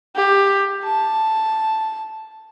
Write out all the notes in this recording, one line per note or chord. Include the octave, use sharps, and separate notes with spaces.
G4
A5